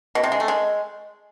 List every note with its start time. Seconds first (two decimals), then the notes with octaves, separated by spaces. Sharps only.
0.15 B2
0.24 C3
0.32 G#3
0.40 A3
0.48 G#3